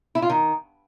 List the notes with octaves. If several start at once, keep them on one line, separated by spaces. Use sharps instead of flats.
E4
F4
D#3